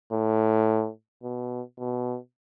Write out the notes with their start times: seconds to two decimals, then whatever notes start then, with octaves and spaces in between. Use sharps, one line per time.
0.12 A2
1.23 B2
1.79 B2